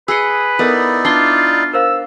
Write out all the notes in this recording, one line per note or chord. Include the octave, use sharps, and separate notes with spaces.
G#4 B4 D#5 E6 C7 C#7
B3 D#4 E4 A4 A#4 D5
D4 F4 C7 G7
A#4 C5 F5 E6